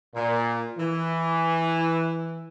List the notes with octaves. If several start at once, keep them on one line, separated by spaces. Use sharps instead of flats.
A#2
E3